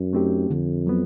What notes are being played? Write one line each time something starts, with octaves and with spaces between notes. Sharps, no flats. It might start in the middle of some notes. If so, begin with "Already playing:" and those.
Already playing: F#2
A3 C4 D#4 G4
F2 D3
F#3 B3